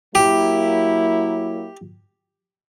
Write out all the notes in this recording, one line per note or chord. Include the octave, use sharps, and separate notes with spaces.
F#3 A#3 E4 G4